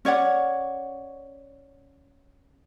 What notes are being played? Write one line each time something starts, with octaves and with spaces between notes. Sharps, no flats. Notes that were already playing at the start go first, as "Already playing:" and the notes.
C#4 C#5 D5 F#5